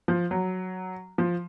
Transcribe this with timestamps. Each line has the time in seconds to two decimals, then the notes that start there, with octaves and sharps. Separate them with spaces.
0.08 F3
0.31 F#3
1.18 F3